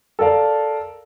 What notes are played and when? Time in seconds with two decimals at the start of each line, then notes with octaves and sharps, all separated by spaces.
0.19 A4 A#4 D5 F5